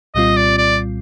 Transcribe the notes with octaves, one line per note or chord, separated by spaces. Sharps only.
C2 A#2 G3 C4 F4 D#5
D5
D5